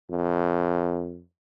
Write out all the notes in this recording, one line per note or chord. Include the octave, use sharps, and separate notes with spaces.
F2